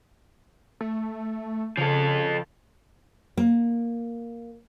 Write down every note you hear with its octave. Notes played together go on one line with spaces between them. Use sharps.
A3
C#3 F3 A4
A#3